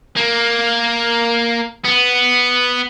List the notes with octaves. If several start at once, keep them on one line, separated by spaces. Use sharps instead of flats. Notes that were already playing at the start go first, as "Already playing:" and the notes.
A#3
B3